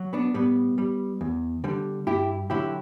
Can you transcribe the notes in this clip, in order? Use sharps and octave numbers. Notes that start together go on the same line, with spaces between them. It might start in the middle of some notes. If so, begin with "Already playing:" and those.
Already playing: F#3
B3 D4
A2 G3 B3
G3
E2
D3 G3
G2 E4 G4
D3 F#3 E4 G4